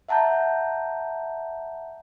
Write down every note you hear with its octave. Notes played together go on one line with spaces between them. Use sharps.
E5 F#5 A5 A#5 G6